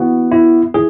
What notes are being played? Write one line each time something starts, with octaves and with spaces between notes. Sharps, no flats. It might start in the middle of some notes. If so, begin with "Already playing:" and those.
Already playing: E3 B3 F#4
E4
E3 G#4